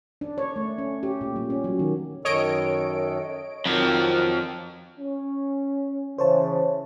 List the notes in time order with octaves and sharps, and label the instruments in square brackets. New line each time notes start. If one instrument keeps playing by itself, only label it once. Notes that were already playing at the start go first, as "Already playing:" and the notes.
[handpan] D4
C#5
A3
C#4
G4
A#2
G3
C#4
F#3
D#3
[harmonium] F#2 D#3 A4 [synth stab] C#5 D#5 D7
[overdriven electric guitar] F2 F3 [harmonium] D#3 F#3
[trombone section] C#4
[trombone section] C#3 E3 [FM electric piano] C5 C#5 A5